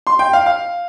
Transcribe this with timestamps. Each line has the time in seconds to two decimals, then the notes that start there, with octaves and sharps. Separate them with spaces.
0.07 C6
0.19 G5
0.33 F5
0.46 F5